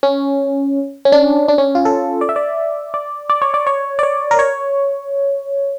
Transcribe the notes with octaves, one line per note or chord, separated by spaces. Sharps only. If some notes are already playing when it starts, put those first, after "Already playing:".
C#4
C#4
D4
D4
C#4
F4
A4
D5
E5
D5
D5
D5
C#5
D5
C#5
D5
C#5
A#4
C#5